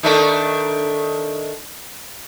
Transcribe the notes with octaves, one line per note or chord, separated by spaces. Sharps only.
D#3 A3 D4